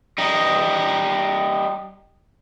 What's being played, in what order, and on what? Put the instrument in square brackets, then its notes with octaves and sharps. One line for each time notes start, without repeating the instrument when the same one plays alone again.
[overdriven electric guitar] G3 D#4